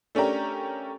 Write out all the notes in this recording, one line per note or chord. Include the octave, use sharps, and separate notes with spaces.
A3 C#4 D4 G4 A#4